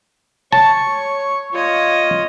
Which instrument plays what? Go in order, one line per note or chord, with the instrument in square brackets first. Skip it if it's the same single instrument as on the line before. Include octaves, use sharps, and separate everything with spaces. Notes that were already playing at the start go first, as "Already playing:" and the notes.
[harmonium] C#5 [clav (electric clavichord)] A5 [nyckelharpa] C#6
[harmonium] F4 [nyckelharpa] C#5 D#5